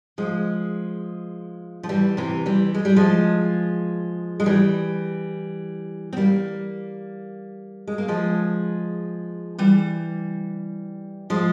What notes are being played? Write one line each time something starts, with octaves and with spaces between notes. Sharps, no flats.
F3 G#3
F3
E3 G3
C3 E3
E3 G3
G#3
G3
F3 G#3
G#3
E3 G3
C4
G3 A#3
G#3
A#3
F3 G#3
E3 G3
F3 G#3